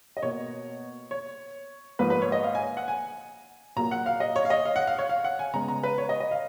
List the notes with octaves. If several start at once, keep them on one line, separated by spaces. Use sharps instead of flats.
D#5
B2 A#3 C#5
C#5
G#2 F3 A#3 B4
B4
C#5
D#5
F5
G#5
F#5
G#5
A#2 F#3 A#3 A#5
F#5
F5
D#5
C#5
F5
D#5
F5
F#5
F5
C#5
F5
F#5
G#5
C#3 G#3 B3 A#5
A#5
B4
C#5
D#5
D#5
F5